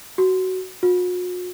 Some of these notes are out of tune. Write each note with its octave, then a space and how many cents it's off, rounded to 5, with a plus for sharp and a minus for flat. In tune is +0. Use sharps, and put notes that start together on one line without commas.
F#4 +15
F#4 -45